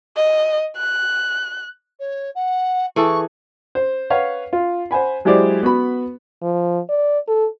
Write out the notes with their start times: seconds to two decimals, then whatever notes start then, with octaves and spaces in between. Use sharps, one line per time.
0.17 D#5
0.77 F#6
2.00 C#5
2.35 F#5
2.96 E3 G#4 A4 C#6
3.75 C5
4.10 B4 C#5 F5 F#5
4.53 F4
4.91 C5 F#5 G#5 B5
5.25 F#3 G#3 E4 G4 C5 D5
5.63 B3 F#4 B5
6.42 F3
6.89 D5
7.27 A4